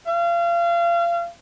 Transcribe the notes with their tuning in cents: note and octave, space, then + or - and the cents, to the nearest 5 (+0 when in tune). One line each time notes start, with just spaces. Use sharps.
F5 -30